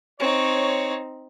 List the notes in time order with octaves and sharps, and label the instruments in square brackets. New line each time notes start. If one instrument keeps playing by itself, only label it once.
[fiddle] C4 D#4 [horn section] C#5